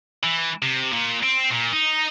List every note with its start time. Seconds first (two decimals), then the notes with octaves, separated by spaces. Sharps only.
0.23 E3
0.62 C3
0.93 A#2
1.23 C4
1.52 A#2
1.73 D#4